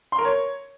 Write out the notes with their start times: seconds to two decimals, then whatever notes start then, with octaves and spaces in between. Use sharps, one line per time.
0.12 C6
0.19 A#4
0.25 C#5